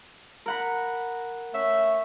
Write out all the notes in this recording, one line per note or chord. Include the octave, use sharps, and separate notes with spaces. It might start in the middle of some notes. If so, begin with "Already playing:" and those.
A#4 F#5 B5
A3 C#4 E5